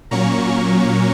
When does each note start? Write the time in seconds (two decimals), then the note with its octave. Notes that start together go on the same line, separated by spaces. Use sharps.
0.11 A#2 F#3 A#3 C#4 A#5 C#6